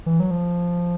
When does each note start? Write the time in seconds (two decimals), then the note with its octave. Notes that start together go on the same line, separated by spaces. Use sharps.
0.06 E3
0.20 F#3
0.31 F3